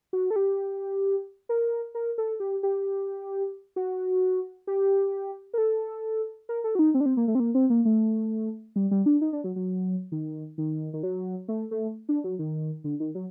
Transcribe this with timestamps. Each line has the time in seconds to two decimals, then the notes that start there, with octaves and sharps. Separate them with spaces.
0.13 F#4
0.31 A4
0.36 G4
1.49 A#4
1.95 A#4
2.18 A4
2.40 G4
2.63 G4
3.76 F#4
4.67 G4
5.54 A#4
5.58 A4
6.49 A#4
6.64 A4
6.75 F#4
6.79 D#4
6.94 C4
7.00 D4
7.06 C4
7.17 A#3
7.28 A3
7.35 C4
7.40 A#3
7.55 C4
7.70 A#3
7.85 A3
8.76 G3
8.91 G3
9.06 D4
9.21 D#4
9.33 D4
9.44 F#3
9.56 F#3
10.12 D#3
10.58 D#3
10.93 D#3
11.03 F#3
11.48 A3
11.71 A3
12.09 D4
12.24 F#3
12.39 D#3
12.84 D3
13.00 D#3
13.15 F#3